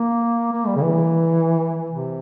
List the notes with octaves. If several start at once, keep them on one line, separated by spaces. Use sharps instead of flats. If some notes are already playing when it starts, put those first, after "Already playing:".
Already playing: A#3
A#3
G3
C#3
E3
C3